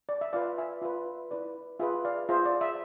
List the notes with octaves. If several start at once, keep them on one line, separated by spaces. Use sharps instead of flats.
D5
E5
F4 B4 D5 F5
E5 G#5
F4 B4 E5
E4 B4 D5
F4 G#4 B4 E5
D5 F5
F4 G#4 C5 E5
D5
E5